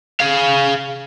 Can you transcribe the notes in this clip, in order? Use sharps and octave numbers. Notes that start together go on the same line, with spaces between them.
G#4 F5